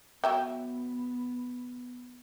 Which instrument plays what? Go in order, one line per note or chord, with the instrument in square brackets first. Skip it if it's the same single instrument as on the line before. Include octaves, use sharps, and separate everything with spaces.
[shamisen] F#3 E5 G5 [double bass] B3